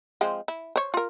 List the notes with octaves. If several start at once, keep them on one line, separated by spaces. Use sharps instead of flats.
F3 G#3 C4
E4
C5 C#5
F4 A#4